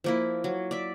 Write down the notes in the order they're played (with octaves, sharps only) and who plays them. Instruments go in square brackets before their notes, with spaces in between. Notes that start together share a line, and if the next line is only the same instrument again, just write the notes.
[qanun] F3 A#3 E4
F#3
D5 E5